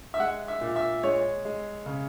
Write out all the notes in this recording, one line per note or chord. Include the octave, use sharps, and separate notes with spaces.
E5
G#3 F#5
E5
A#2
E5
G#3 C#5
G#3
C#3